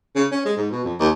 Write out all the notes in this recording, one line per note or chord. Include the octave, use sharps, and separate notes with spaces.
C#3
C#4
G#3
G#2
B2
F2
D#2